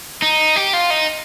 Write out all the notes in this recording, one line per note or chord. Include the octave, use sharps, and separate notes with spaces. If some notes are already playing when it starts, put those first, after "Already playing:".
D#4
G4
F4
D#4